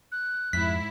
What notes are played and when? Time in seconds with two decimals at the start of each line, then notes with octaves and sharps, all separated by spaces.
0.12 F#6
0.53 F2 G#2 E4 B6